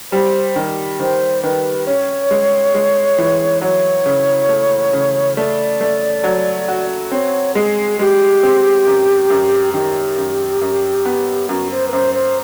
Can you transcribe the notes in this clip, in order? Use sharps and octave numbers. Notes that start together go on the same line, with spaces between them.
G3 C5
D#3
D#3 C5
D#3 B4
C#4 C#5
G#3
G#3
E3
F#3 C#5
C#3
A3
C#3
A3 D5
A3
F#3
F#4
C4 C#5
G#3 G#4
G#3 G4
C4
F#2
F#2
D#3 G4
F#2
F#2
B3
F#2 F#4
C5
B4
F#2 C5
C5